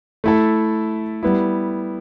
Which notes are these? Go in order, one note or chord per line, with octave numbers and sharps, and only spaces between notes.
A3 E4 A4
G3 B3 E4